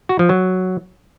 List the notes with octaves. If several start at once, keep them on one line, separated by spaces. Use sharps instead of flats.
F#4
F3
F#3